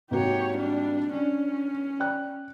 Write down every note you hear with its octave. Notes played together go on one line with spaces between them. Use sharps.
G#1 A#3 F#4 G4 C#5
G3 D4
C#4 D4
D5 G5 F#6